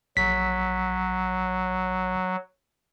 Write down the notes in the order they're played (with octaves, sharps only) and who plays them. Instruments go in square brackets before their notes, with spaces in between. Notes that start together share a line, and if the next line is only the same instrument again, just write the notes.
[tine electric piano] A#1 B6 [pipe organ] F#3